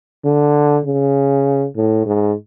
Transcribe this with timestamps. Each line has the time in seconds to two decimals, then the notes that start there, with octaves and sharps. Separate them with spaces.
0.25 D3
0.85 C#3
1.76 A2
2.06 G#2